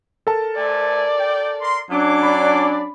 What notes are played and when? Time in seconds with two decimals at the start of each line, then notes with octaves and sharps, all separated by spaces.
0.27 A4 A#4 A5
0.57 A3 C5 D5 G#5
1.19 G5
1.61 A#4 C6
1.91 F#3 C#4 D4 C#5 D6
2.23 D5 B5